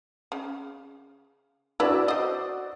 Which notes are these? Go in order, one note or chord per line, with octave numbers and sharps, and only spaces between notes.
C#3
E4 F#4 B4 D5 E6
C5 D#5